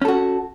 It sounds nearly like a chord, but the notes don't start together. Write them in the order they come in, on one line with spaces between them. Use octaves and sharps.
C#4 A4 F#4